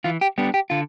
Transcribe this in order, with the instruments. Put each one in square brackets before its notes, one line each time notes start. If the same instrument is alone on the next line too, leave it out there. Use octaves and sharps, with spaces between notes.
[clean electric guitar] E3 F4
G4
G3 B3 D4
G4
D3 F4